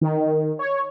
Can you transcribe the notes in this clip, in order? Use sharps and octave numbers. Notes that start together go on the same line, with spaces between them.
D#3
C#5